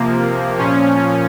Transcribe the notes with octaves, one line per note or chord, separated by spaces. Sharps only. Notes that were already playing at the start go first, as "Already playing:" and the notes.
Already playing: C3 F3 A#3
A#2 F3 C#4